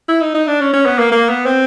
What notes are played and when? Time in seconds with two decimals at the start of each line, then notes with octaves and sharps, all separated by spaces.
0.08 E4
0.21 D#4
0.34 D#4
0.47 D4
0.60 C#4
0.73 C#4
0.85 B3
0.98 A#3
1.11 A#3
1.29 B3
1.46 C4